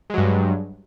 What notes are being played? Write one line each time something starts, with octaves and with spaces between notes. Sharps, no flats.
G2 F#3 G#3